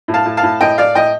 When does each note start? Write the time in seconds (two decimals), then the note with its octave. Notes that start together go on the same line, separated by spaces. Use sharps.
0.08 A2
0.14 F5 A5
0.25 A2
0.37 F5 A5
0.43 A2
0.61 A2 D#5 G5
0.78 A2 D5 F5
0.95 A2 D#5 G5